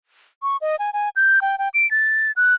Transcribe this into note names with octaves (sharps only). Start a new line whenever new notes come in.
C#6
D#5
G#5
G#5
G6
G5
G5
D7
A6
F#6